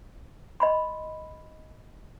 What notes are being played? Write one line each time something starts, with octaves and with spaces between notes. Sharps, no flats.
D#5 B5 C6